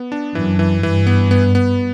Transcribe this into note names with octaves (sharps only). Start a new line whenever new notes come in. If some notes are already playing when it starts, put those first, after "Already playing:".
Already playing: B3
D4
F#2 E3
E3
G2 E3
B3
B3
B3